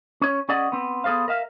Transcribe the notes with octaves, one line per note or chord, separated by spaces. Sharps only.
C#4 C#5
C#4 G#4 D5 D#5 F#5
B3 C4
B3 G#4 A4 C5 F5
A#4 E5 F5